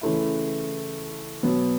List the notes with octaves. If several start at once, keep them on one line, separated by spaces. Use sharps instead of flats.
C#3 E3 A3 C#4 E4
B2 F#3 B3